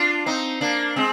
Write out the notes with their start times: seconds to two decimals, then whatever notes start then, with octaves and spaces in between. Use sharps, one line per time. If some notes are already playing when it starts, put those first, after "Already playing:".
Already playing: D4 F4
0.26 C4 D#4
0.61 A#3 D4
0.96 G#3 C4